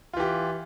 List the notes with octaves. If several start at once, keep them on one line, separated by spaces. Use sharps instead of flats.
E3 F4 G4